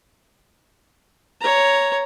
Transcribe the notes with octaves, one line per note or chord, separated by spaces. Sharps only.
C#5 A#5